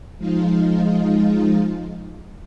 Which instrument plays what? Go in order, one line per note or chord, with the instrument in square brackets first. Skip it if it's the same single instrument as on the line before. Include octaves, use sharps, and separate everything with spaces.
[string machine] F3 G#3 D#4 F4